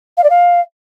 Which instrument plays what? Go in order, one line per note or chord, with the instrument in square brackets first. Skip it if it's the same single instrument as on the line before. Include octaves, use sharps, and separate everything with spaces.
[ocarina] F5
D5
F5